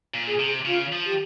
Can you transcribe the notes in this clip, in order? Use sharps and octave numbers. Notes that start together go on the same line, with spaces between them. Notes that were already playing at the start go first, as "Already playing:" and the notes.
A#2
G#4
C3
C#3 F4
F3
G4